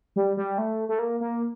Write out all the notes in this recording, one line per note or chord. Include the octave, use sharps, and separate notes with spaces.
G3
G3
A3
A3
A#3
A#3